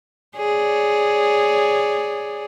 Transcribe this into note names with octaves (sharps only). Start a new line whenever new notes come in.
G#4 C#5 D5